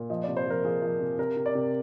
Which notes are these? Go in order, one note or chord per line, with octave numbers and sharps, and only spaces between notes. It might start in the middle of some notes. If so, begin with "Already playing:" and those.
Already playing: A#2
F3 D#5
C3 D5
C5
F3 A#4
F3 G#4
F3
C3
C3 A#4
C3
D5
C3